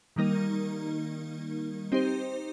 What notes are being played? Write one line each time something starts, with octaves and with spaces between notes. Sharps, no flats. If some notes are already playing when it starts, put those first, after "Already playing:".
D#3 G3 A#3 D#4 A#4
C4 D#4 G4 C5